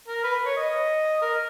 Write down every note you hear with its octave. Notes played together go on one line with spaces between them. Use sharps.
A#4
B4
C#5
D#5
A#4